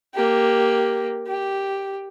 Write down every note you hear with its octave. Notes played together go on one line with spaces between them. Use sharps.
A#3 G4
G4